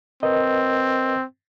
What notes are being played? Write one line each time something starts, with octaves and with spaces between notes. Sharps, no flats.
C4 A#4 B4 D#5